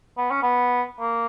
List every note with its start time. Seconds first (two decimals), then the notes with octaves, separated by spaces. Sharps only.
0.18 B3
0.31 C#4
0.43 B3
1.00 A#3